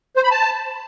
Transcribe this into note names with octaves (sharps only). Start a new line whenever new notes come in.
C5
B5
A5